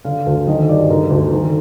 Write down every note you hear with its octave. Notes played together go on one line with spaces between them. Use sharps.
D3 F5
D2
D#3 D#5
G2 D5
D3 A#4
D2
D#3